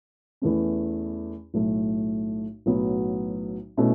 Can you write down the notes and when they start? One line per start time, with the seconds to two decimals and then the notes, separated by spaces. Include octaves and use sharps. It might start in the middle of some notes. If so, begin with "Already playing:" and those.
0.42 E2 E3 A3 C#4
1.54 B1 A2 A3
2.66 B1 A2 F#3 B3
3.77 B2 A3 C#4 E4